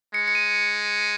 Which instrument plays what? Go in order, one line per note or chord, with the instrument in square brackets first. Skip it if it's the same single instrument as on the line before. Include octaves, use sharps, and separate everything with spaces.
[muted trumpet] G#3 [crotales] C#7
[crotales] C#7
D#7